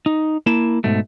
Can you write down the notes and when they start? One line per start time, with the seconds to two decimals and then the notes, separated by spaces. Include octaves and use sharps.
0.06 D#4
0.46 A#3 E4 A5
0.84 G#2 B2 A3